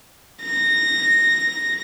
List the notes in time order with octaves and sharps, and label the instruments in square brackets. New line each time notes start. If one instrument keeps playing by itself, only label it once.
[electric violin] A#6